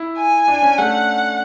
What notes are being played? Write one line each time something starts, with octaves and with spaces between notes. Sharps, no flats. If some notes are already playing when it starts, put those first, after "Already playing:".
Already playing: E4
G#5
D4
C#4
A3 F#5